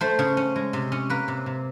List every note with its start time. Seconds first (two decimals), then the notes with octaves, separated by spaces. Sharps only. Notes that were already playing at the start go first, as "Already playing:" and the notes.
0.01 A3 C5
0.19 C#3
0.37 C#4
0.56 G#3
0.73 C3
0.92 C#4
1.10 A#3 B4
1.28 C3
1.46 C3